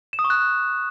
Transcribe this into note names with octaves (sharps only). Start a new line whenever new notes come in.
E7
D#6
C#6
F#6